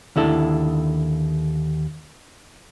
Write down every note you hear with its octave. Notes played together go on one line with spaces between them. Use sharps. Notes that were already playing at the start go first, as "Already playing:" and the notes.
D#2 D3 E4 A4